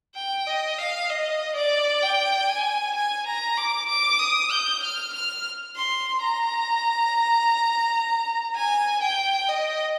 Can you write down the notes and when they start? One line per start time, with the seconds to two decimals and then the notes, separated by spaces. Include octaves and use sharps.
0.15 G5
0.47 D#5
0.78 F5
1.10 D#5
1.56 D5
2.02 G5
2.49 G#5
2.95 G#5
3.26 A#5
3.57 D6
3.88 D6
4.19 D#6
4.51 G6
4.83 F6
5.13 F6
5.76 C6
6.21 A#5
8.55 G#5
9.01 G5
9.48 D#5